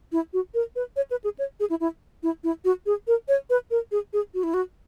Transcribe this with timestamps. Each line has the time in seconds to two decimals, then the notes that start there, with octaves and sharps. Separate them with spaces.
0.12 E4
0.33 F#4
0.54 A#4
0.76 B4
0.96 C#5
1.11 B4
1.24 G#4
1.39 C#5
1.60 G#4
1.70 E4
1.80 E4
2.23 E4
2.44 E4
2.64 F#4
2.86 G#4
3.07 A#4
3.28 C#5
3.50 B4
3.71 A#4
3.91 G#4
4.13 G#4
4.34 F#4
4.43 E4
4.54 F#4